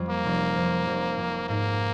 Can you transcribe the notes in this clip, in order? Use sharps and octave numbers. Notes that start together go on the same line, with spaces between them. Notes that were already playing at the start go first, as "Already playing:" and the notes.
Already playing: F2 G3
A#3
F1
F2
F1
F2
G#2 A#3